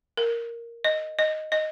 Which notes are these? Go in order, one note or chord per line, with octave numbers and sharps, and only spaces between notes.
A#4
D#5
D#5
D#5